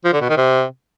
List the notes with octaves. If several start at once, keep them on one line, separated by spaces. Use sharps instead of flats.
F3
D3
B2
D#3
C3